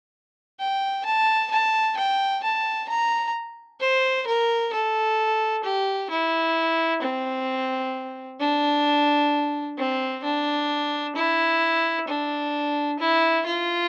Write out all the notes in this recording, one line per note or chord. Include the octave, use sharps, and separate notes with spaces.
G5
A5
A5
G5
A5
A#5
C5
A#4
A4
G4
E4
C4
D4
C4
D4
E4
D4
E4
F4